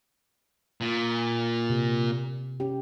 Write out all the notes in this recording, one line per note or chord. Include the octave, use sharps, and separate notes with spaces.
A#2
C3
C#4 G4